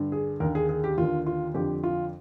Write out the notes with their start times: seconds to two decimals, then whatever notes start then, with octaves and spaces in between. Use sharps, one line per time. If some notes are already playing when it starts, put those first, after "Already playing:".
Already playing: G2 D3
0.12 G#4
0.40 D#2 D3 A#4
0.55 G#4
0.69 G#4
0.84 G4
0.98 D#2 D3 F4
1.26 F4
1.54 F2 D3 G4
1.84 F4